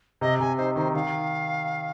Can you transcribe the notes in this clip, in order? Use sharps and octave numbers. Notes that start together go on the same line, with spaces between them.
C3 D#5
C3 G#5
D#4 C5
D#3 C5
D#3 F5